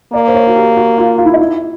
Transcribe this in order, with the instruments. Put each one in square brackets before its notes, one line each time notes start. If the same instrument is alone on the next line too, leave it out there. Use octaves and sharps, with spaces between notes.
[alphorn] A#3 [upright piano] D5
[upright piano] C5
C#5
F#4
G4
F#4
F4
F4
E4
D#4
E4